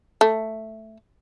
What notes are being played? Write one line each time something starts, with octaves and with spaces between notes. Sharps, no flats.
A3